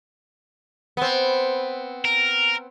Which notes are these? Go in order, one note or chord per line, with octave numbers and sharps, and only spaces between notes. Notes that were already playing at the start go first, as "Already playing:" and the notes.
B3 C4
A#4